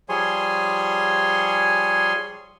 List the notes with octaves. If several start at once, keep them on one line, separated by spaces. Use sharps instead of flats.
F3 G3 G#4 C#5 G#5 C6